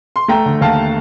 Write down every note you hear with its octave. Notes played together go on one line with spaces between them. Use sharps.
C6
A3 G5 A#5
D3
D#2 F5 A5